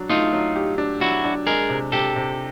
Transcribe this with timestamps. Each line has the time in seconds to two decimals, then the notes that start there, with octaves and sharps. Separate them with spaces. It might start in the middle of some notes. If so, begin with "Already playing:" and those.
Already playing: F#3 D4
0.09 A3 D#4 F4
0.33 F#3
0.55 G4
0.78 D4
1.01 F#3 E4 F#4
1.24 D4
1.46 G#3 G#4 A#4
1.69 C3
1.92 C3 G4 A4
2.16 C3